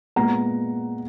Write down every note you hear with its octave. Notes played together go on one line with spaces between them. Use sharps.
A#2 G#3 B3 F#5 A#5